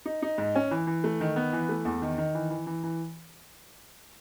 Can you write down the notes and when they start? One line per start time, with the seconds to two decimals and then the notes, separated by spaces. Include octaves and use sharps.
0.06 D#4
0.22 D#4
0.38 G#2
0.55 C#4
0.71 E3
0.87 E3
1.04 A3
1.21 D#3
1.36 B3
1.53 E3
1.69 A3
1.85 E2
2.02 D#3
2.18 D#3
2.35 E3
2.50 E3
2.67 E3
2.84 E3